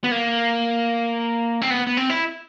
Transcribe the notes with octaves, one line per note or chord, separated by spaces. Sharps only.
B3
A#3
C4
B3
B3
C4
E4